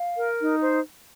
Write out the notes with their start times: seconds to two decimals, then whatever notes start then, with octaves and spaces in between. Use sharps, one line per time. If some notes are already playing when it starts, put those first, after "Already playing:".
Already playing: F5
0.17 A#4
0.40 D#4
0.63 C5